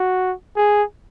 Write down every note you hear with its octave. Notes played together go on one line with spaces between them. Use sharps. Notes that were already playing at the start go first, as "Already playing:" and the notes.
Already playing: F#4
G#4